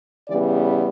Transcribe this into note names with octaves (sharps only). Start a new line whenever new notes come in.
E2 C#3 E3 G3 B3 D5